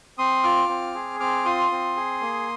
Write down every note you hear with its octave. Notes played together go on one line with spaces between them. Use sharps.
C4 C6 D#6
F4 D6 F6
C4
G#4
C4 D6 F6
F4 C6 D#6
C4
G#4
A#3